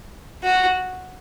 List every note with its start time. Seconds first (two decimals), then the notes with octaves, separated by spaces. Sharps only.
0.43 F#4